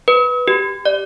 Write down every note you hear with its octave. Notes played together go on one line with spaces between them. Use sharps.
B4
G4
D5